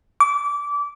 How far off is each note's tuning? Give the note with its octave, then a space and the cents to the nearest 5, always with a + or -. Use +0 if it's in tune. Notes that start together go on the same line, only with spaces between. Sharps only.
D6 -25